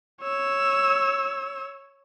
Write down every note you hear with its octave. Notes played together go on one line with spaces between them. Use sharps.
C#5 E6